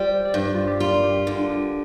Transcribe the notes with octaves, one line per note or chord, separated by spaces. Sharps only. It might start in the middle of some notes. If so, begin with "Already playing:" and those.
Already playing: G3 F4 G4 C5
D5
G2 C5
F4
G4
F4 A#4
G4
D3 G4
G4